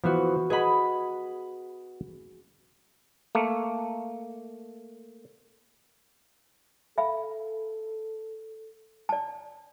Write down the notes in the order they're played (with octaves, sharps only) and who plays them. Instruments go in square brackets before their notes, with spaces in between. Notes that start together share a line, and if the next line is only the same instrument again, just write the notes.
[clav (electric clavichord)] E3 F3 [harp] B3 F#4
[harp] G#4 B5 [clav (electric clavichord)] B4 D#5 F#5
[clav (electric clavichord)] A3 A#3
[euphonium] A4 [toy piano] E5 F5 B5
[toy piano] D5 A5